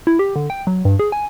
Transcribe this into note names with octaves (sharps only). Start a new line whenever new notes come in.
E4
G4
D3
G5
F#3
G2
G#4
G#5